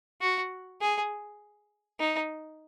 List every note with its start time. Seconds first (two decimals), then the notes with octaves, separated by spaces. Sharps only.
0.21 F#4
0.81 G#4
2.00 D#4